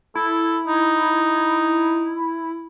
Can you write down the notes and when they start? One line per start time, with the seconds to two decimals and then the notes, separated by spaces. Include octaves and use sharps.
0.15 E4 A4
0.67 D#4